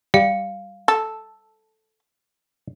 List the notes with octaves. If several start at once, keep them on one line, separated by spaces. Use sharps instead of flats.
G3 F5 C#7
A4